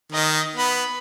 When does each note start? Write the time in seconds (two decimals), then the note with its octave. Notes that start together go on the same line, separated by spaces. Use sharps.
0.12 D#3 D#5
0.56 B3 B5